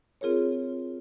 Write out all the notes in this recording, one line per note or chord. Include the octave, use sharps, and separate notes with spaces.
C4 F4 G#4 A#4 C#5